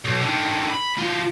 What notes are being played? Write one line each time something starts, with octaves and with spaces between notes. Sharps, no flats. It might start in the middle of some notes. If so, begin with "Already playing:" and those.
B1
D3 D#3
B5
E3 F4